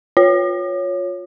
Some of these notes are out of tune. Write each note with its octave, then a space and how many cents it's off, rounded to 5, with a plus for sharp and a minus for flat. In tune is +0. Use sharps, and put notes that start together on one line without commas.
F4 +25 C#5 +0